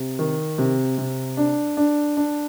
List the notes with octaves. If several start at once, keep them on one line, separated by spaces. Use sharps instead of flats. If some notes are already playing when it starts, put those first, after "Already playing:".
Already playing: C3
D#3
C3
C3
D4
D4
D4